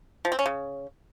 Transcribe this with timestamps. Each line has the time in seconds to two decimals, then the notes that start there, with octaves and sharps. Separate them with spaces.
0.25 F3
0.32 C4
0.39 C#4
0.46 C#3